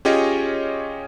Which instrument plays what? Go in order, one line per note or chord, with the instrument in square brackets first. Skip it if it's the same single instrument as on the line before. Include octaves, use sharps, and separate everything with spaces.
[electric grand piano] C#4 F4 G4 G#4 C#5 D#5